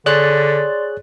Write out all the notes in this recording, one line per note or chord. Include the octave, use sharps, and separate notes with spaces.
D3 G#4 C#5 D5 C6 F#6 A6